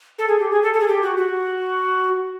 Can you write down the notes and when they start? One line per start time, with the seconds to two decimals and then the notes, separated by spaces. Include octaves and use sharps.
0.18 A4
0.28 G#4
0.39 G4
0.51 G#4
0.62 A4
0.74 A4
0.80 G#4
0.88 G4
1.02 F#4
1.17 F#4